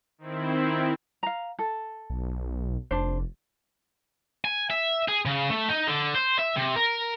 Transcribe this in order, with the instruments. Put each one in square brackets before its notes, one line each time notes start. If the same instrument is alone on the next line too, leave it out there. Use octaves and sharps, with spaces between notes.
[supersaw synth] D#3 C4 E4
[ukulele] F5 A#5
A4
[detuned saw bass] B1
[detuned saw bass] F1 [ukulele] D4 C5
[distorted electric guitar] G#5
E5
G#4
C#3
A3
D#4
D3
C5
E5
C3
A#4